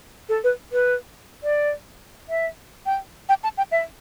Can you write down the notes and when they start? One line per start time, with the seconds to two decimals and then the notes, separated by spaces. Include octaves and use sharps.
0.29 A4
0.44 B4
0.72 B4
1.44 D5
2.29 E5
2.86 G5
3.29 G5
3.44 A5
3.58 G5
3.72 E5